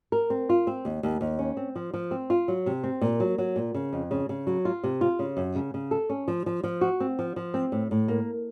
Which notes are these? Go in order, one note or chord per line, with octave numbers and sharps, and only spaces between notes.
A#4
C4
F4
C4
D#2
D#2
D#2
C#4
C4
F3
F3
C4
F4
F#3
C3
C4
A#2
F#3
F#3
A#2
C#3
F2
C#3
C#3
F#3
F4
C3
F4
C#3
F#2
C#3
C#3
A4
C#4
F3
F3
F3
F#4
C4
F3
F3
C4
A2
A2
A#3